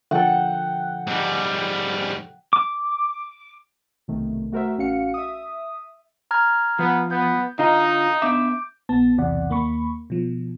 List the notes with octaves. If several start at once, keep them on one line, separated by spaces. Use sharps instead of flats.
D3 F3 A4 F#5 G5
G#2 G3
D6
B1 C3 D#3 A3
A3 F#4 A#4 C5 E5
A1 C#4 F#4 F5 C#7
E5 D#6
A#5 F6 G#6
F3 B3
B3 G6
D3 D#4 F4 D#5 F5 A#5
B3 D4 E5 D6 G6 D7
A#1 B3 A5
B1 E2 C3 D5 F#5
D#2 A#3 B5 C#6
B2 F3